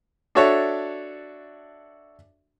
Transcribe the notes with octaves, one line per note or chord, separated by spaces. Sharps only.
D4 F#4 A4 C#5 E5